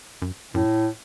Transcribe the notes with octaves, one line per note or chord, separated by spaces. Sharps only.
F#2
F#2 A2